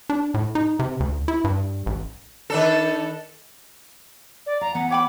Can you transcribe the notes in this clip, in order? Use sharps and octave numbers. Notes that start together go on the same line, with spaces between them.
D4
A2
D#4
C3
D2
E4
G2
A1
D#3 D4 A4
D5
F5 A#5
E3 B3 F#5
C#5 G5 B5 D6